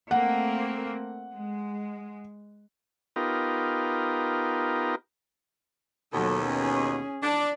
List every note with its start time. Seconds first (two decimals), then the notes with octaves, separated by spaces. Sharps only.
0.11 A3 A#3 C4 F#5
1.34 G#3
3.16 B3 D#4 F4 G4 A#4
6.13 D#2 B2 F#3 A4
6.46 C#4 G#4
7.23 D4 D5